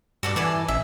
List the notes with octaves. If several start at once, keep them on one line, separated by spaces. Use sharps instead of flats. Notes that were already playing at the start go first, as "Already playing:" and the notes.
G2 F#4 A4 D5
E3 A4 D5 G#5
A1 E5